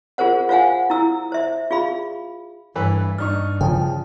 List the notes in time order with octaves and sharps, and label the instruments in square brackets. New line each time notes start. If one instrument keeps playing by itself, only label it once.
[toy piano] F4 G#4 A#4 C5 F#5
F4 C5 F5 F#5 G#5
E4 A#5 E6
C5 E5
F4 G#4 F5 B5
[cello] G2 [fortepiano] E3 B4 E6
[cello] G2 [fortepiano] D4 D#4 C#6 [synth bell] F6
[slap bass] C#3 F3 [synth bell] G5